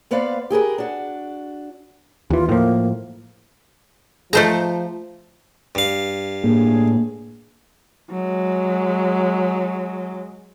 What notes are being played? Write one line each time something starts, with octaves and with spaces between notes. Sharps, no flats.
A#3 B3 B4 C5 D5 F5
G4 G#4 A#4 B4
D4 F#4
D#2 E3 F4
A2 F3 A#3
F3 A3 G#4 A4 C5 D#5 A#5
G2 F5
A2 A#3 D4 G#4
F#3 G#3